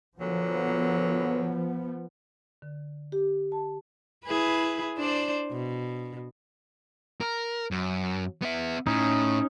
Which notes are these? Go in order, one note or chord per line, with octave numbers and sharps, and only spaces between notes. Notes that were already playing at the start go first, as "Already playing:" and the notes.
A#2 D3 F3 F#3 B3
D3
G4
A5
E4 G#4 B4
D4 C5 D5
B2
A#4
F#2
B3 E5
A2 C#4 D#4